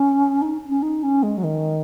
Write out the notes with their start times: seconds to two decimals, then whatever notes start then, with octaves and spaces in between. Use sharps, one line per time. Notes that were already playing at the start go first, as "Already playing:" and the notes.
Already playing: C#4
0.42 D#4
0.69 C#4
0.82 D#4
1.03 C#4
1.23 G#3
1.38 F#3
1.44 D#3